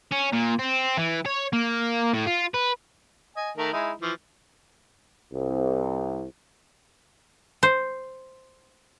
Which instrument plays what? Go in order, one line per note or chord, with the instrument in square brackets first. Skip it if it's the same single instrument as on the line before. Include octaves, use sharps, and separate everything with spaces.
[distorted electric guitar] C#4
A#2
C4
E3
C#5
A#3
A2
F4
B4
[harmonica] D#5 G#5
D#3 A3 A#4
G#3 D#4 E4
E3 F3
[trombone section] C2
[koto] C5